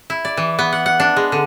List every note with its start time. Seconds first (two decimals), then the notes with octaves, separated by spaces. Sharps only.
0.10 E4
0.25 D5
0.37 E3
0.59 B3
0.73 F#5
0.86 F#5
1.00 D4
1.17 G#3
1.32 D3